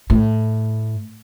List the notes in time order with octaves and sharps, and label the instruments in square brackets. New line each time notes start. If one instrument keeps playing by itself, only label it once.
[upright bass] A2